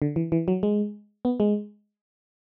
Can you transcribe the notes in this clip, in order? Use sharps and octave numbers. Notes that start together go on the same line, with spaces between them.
D3
E3
E3
F#3
G#3
B3
G#3